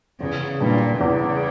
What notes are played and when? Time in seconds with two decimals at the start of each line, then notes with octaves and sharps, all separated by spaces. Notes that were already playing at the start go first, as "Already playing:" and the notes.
0.20 E2 C#3
0.60 A#2 E3 G3 D4
1.01 E2 C#3